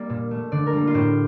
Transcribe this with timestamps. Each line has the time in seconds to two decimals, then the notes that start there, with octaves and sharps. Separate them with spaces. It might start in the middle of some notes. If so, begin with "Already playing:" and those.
Already playing: G3 A#3 D5
0.10 A#2
0.31 A3
0.52 D3 D5
0.67 A#4
0.73 G3 A#3
0.87 F4
0.94 A2 G4